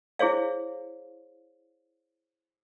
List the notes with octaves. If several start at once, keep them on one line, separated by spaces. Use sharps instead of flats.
E4 G#4 C5 C#5 F5